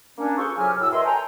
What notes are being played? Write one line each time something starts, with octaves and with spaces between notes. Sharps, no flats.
A#3 C#4 D4
F4 G#4 A4 C5 C6 C#6
C2 C#3 F#3 G4 G#5 F6
F#2 A2 E6
A#4 B4 C#5 D#5 E5 C6
A4 G5 G#5 A#5